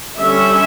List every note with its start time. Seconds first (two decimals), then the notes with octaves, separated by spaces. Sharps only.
0.18 D3 G3 C#4 E5